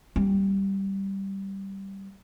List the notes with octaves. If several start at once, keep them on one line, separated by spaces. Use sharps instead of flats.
G3 A#3